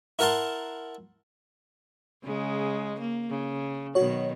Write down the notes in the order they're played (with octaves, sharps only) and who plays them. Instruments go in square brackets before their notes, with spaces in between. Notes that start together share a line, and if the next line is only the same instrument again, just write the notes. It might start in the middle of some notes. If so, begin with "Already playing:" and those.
[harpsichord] E4 A#4 F#5 A5 C6
[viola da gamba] C#3 G#3
A#3
C#3
[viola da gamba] B2 D#3 F#3 [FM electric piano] F#4 C#5